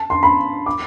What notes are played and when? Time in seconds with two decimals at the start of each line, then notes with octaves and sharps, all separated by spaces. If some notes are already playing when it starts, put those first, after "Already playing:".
Already playing: A5
0.10 C6
0.23 B5
0.66 D6